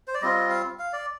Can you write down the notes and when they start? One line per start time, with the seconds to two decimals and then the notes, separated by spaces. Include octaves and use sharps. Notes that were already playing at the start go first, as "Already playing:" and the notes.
0.08 C5
0.14 D5
0.22 G3 C4 F4 D#5
0.50 F5
0.79 F5
0.93 D5